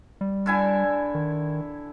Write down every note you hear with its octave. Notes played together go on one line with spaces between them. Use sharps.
G3
D3 E4 G#5
D#3